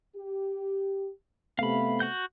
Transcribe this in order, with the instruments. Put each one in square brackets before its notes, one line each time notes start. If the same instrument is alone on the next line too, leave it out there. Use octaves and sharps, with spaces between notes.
[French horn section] G4
[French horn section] C3 A3 B3 [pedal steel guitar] F5 B5
[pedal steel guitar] F#4 F#5 G6